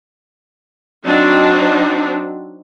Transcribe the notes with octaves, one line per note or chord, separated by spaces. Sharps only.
F#3 C4 D4 D#4 F#4